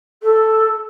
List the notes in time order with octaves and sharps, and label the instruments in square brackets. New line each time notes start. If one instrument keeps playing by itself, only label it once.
[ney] A4